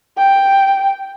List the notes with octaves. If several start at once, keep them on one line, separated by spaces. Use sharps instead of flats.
G5